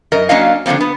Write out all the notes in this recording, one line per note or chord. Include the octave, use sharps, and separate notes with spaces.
F#2 A#4 D#5
F#3 A#3 C#4 D4 D#5 F5
D3 F3 G3 A#3 C4
B3